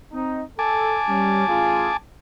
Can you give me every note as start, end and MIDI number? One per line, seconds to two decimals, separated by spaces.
0.13 0.43 60
0.13 0.43 63
0.59 0.97 69
0.59 1.97 80
0.59 1.97 81
0.59 1.97 86
1.08 1.46 55
1.08 1.46 61
1.08 1.46 67
1.48 1.91 33
1.48 1.91 65
1.48 1.91 68